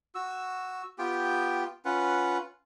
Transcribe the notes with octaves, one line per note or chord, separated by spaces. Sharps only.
F#4 E6
B3 F4 G4 G5
C#4 F4 B4 F#5